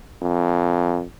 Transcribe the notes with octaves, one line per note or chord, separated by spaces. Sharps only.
F2